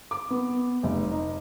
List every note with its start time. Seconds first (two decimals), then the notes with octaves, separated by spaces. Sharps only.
0.11 D6
0.30 B3
0.83 F1
1.11 D#4